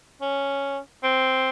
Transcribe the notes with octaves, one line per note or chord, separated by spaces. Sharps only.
C#4
C4